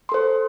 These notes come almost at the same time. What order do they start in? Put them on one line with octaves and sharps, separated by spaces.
C6 A4 C5